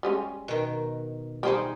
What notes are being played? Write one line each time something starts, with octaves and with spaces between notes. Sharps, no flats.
G3 G#3 C#4
B2 D#3
G3 D#4 G4 G#4 C5 G5